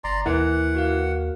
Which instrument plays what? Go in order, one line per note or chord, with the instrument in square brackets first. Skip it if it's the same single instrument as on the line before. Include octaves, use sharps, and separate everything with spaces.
[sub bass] G1 [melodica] D5 A#5 C6 [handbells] D6
[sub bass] D#2 [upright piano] E3 [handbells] A#4 [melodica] F#5
[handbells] F#4 A#4 F5